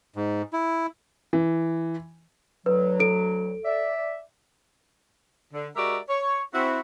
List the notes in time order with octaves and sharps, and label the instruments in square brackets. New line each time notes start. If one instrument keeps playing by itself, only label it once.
[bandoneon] G#2
E4
[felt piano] E3
[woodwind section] D2 F#3 [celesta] B4
[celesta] A4 D7
[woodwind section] D5 E5
[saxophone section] D3
G#3 F#4 G4 A#4 D5 E5
C#5
C4 E4 F#4